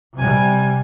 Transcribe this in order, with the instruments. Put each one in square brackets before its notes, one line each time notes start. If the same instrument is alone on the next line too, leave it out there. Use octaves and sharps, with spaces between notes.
[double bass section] C3 G3 [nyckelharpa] G#5